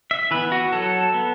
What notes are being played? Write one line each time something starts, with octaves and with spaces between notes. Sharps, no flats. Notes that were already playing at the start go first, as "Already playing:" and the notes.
E5
E3 B3 B4
F#4
F#3 A4
B3